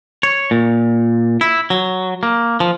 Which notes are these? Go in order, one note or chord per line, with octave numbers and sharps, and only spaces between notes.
C#5
A#2
E4
F#3
A#3
F3